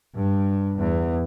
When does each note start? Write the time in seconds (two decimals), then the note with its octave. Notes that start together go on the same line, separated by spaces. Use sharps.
0.14 G2
0.78 E2